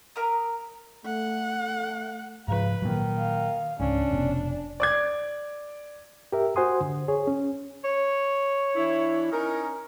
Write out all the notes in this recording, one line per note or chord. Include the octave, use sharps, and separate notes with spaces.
A#4 E5 A#5 D#6
A3 F#5
G#2 C#3 F3 B4
A#2 D#3 F#3
F5
C#2 G#2 C#4 D4
F1 B2
D5 D6 G#6
G4 A#4 E5
F#4 C5 F#5 G#5 C6 D#6
D3
G#4 C#5
C#4
C#5
E3 D4 E4
C#4 D#4 A#4